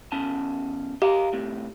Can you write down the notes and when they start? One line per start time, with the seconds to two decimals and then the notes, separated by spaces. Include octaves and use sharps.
0.12 E2 C#4 A5
1.02 G4 D#5 F5 A#5
1.33 A2 C3